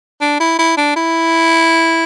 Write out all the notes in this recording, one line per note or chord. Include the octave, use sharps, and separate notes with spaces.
D4
E4
E4
D4
E4